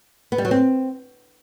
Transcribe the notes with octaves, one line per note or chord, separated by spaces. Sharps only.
B3
G3
F#3
C4